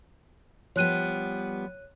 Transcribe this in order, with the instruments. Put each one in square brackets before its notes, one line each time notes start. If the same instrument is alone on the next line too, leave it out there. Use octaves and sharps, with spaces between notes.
[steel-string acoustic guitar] F3 G3 B3 [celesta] C#5 F#6 D#7